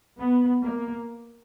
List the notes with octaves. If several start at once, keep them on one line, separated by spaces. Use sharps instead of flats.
B3
A#3